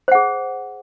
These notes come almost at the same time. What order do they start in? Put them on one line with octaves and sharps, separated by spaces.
C5 F#5 G#4